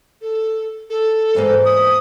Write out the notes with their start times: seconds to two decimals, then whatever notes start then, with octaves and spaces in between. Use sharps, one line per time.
0.22 A4
0.90 A4
1.35 E2 G#2 A#3
1.65 D#6